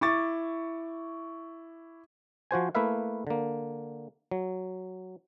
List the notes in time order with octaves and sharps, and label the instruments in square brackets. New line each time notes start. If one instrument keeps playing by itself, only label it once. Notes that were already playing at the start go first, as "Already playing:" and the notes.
[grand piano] E4 C#6 D6 A6
[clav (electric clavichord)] F3 F#4 C5 G#5
A3 A#3 E4 B4 E5 F5
D3 A#3
F#3